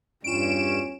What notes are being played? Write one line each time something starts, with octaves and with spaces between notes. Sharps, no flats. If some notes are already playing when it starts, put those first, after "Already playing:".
E2 G2 G3 C#4 F4 D7 E7